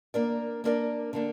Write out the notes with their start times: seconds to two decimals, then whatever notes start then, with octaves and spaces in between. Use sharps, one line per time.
0.14 A#3 D4 A#4 D5
0.64 A#3 D4 A#4 D5
1.13 D3 A#3 D4